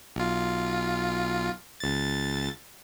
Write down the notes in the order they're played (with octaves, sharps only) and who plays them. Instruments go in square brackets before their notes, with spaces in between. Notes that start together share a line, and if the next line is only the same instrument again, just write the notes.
[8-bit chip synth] B1 F4
C#2 A6